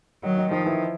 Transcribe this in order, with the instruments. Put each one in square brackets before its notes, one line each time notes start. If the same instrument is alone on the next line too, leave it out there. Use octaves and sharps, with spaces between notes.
[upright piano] D#3 D#4 [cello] F#3
[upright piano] D#3 D#4
[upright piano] D#3 D#4 [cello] F3
[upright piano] E3 E4